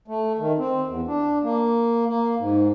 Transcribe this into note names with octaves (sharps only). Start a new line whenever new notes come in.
A3
D#3
C4
E2
D4
A#3
A#3
G#2